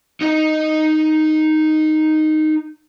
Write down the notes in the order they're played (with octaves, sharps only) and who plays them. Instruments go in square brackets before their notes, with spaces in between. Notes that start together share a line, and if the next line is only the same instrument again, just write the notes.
[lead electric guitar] D#4 D#5